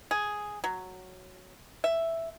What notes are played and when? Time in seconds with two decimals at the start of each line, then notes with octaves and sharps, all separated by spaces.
0.11 G#4
0.64 F#3
1.84 E5